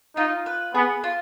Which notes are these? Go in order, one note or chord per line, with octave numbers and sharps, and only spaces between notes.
D#4 F4
B4
B3 G#4
F4